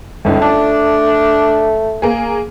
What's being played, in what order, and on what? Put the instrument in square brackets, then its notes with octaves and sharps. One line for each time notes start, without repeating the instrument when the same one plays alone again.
[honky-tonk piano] G1 C#2 D#4 [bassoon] A3
[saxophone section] D4 [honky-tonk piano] A5
[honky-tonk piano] A#3 G#4